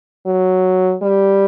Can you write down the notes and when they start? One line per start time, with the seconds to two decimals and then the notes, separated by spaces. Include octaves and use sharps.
0.26 F#3
1.02 G3